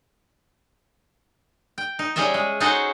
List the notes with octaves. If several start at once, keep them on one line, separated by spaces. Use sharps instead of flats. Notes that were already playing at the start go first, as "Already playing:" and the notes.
G5
D#4
G3 C#4 G#4 D#5 E5
G#3
C#4 D#4 F#4 G#4 A4 C5